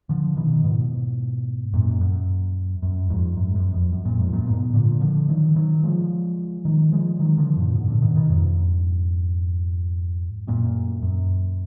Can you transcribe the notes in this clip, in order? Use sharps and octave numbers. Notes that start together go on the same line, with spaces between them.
D3 F3
B2 D#3
G#2 B2
F#2 A#2
F#2
F#2
F2 G#2
F#2
F#2
F2
F#2
F#2 A#2
F2 G#2
F#2 A#2
G#2 B2
A#2 D3
D3 F3
D#3 F#3
D#3 F#3
F3 G#3
D#3 F#3
F3 G#3
D#3 F#3
D3 F3
F#2 A#2
G#2 B2
A#2 D3
B2 D#3
B2 D#3
F2 G#2
F#2 A#2
F#2